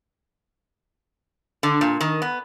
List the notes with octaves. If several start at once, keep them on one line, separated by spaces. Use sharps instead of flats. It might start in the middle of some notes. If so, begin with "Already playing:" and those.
D3
A#2
D#3
B3